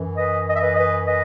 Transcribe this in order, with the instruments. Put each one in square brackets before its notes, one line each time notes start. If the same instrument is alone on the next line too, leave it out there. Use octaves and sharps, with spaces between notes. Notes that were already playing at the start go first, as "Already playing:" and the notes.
Already playing: [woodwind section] F#2 E3
B4 D#5
D#5
E5
B4 D#5
B4 D#5
B4 D#5